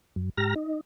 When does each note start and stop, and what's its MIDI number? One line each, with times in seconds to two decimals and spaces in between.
0.16 0.30 42
0.37 0.54 44
0.37 0.54 67
0.37 0.54 82
0.37 0.54 89
0.37 0.54 94
0.56 0.80 63